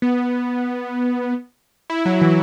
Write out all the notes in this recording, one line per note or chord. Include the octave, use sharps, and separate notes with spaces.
B3
E4
F#3
E3